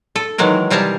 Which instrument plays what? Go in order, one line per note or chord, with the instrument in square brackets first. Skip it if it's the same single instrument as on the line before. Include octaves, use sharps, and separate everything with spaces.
[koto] A4
D#3 E3 F#3 G#3 A#4
C3 G3 G#4 A#4 A5